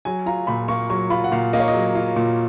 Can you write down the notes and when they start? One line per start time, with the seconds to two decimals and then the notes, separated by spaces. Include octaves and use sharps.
0.05 F#3 G#5
0.26 F4 A#5
0.47 A#2 B5
0.68 A#3 C#6
0.90 F#3 C#6
1.10 F4 B5
1.24 F#5
1.32 A#2 F5
1.53 A#3 D#5
1.60 C#5
1.68 D#5
1.74 F#3
1.95 F4
2.16 A#2